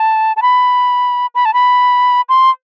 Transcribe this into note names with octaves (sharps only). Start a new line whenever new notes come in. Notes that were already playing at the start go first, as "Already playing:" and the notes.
Already playing: A5
A5
B5
B5
A5
B5
C6